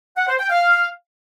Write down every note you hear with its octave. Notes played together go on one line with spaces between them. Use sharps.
F#5
C5
G5
F5